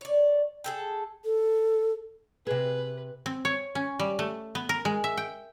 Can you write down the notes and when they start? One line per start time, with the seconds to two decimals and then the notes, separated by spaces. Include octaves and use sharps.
0.01 C#5 D5
0.64 G#4 A4 G5
1.25 A4
2.47 C3 G#4 B4
3.26 C4
3.45 C#5
3.75 C#4
3.99 G3
4.19 A3
4.55 B3
4.69 A#4
4.85 G#3
5.04 E5
5.18 G5